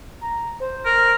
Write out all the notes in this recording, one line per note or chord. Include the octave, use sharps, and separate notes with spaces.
A#5
C5
A#4